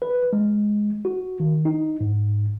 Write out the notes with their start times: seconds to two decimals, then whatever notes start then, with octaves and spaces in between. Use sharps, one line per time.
0.02 B4
0.33 G#3
1.05 F#4
1.40 D#3
1.65 D#4
2.01 G#2